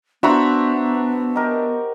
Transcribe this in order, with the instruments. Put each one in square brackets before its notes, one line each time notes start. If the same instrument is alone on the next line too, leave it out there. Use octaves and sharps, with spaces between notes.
[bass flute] B3 [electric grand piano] D4 E5 A#5 [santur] F#4 B5 [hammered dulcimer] B4 C5
[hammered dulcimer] D#4 G4 A#4